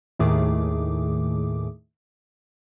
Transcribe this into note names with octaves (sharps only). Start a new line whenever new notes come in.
D#2 A2 D#3 A3 G#4 D6